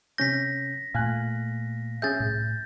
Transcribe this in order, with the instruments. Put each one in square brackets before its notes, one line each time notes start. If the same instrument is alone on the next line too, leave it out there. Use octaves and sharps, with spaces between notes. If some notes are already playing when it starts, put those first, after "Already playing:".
[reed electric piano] C3 C#4 G6 [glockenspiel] A#6 B6
[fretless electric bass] A#2 A3 [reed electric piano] F5 G#5 F#6
[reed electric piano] C#4 G#4 E5 [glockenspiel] G6 A6
[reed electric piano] C2 [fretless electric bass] A2